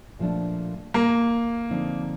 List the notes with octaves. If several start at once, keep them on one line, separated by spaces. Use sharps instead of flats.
A#2 F3 A3 D4
A#3
D3 F3 C4 D#4